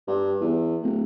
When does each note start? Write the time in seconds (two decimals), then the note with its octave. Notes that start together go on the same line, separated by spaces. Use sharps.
0.08 G2
0.40 E2
0.82 D1